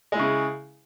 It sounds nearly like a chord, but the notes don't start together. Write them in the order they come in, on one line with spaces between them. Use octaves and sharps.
G#3 E4 C#3